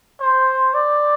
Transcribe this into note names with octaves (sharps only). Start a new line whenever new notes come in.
C5
D5